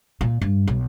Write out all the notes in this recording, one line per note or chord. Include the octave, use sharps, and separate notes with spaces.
A#2
G2
B1